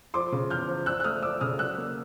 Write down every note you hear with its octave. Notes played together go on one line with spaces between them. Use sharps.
F3 C6 D6
C#3
E2 F6 G6
F3
F3 E6 F#6
F#6
A3 D#6 F6
F3 D6 E6
C#3 D#6 F6
F#3 E6 F#6
A#3